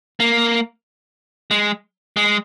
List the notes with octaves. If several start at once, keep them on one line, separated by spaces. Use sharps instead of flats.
A#3
G#3
G#3